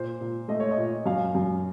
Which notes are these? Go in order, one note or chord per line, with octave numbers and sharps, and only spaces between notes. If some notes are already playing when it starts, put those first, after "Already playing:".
Already playing: A#2 C5
A#2
A3 D#5
C#5
D#5
A#2
F#2 F5
F#2